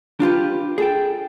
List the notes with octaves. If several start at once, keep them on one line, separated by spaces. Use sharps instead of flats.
D4 F4 G4 B4
G#4 A4 G5